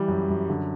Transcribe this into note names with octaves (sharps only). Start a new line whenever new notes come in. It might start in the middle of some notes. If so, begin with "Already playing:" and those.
Already playing: E3 G3
F#2
F#2
D3